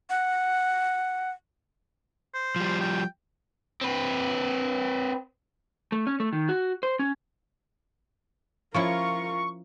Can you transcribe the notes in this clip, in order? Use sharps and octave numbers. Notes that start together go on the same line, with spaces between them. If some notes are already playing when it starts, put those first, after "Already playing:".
F#5
C5
F3 G3
G5
C4 B4
A3
C#4
A3
D#3
F#4
C5
C#4
F3 C#4 E4 F4 A#4 C#6